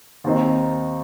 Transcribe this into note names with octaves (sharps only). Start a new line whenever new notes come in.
D#2 D#3 C4 D#4